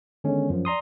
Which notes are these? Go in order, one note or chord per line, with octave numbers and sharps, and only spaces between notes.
D3 D#3 G#3 B3 C#4
F#2 F3
D5 A#5 C6 D#6